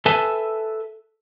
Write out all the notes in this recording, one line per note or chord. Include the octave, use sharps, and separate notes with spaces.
A4 B4 E5 G#5 A5